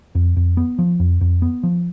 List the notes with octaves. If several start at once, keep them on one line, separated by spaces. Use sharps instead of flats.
F2
F2
B3
F3
F2
F2
B3
F3